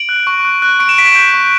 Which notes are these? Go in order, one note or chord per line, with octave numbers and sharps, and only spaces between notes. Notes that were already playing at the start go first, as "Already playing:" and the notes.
Already playing: D7 F#7
F#6
C#6
F#6
F#6
C#6 D7
E7
C#6 B6 D7
G6
C#6